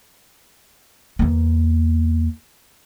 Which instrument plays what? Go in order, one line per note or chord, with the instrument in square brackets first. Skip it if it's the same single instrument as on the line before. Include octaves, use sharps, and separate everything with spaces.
[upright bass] E2 A#3